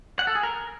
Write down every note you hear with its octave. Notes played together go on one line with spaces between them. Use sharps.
F#5
A4
G#4
A#4